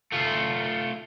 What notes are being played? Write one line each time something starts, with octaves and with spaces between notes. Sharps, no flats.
A3 F4